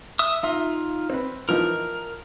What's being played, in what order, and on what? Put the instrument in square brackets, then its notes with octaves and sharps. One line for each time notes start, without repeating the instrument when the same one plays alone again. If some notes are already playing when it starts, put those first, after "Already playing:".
[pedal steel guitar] E5 D#6
[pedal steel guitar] D#4 F4 [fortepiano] E5
[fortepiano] C4 B4
[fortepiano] E3 F3 D#4 [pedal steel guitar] A#4